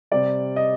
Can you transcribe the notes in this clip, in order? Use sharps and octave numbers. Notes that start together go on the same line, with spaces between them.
C3 G3 D5
D#5